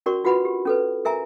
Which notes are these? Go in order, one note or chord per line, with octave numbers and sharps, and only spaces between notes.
C#4 F#4 A#4 D5 C#6
D4 F4 F#4 B4 F#5 B5
G4
C#4 A4 B4
A#4 E5 G#5 A#5